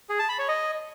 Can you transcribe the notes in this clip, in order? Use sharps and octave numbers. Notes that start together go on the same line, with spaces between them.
G#4
A5
B5
C#5
D#5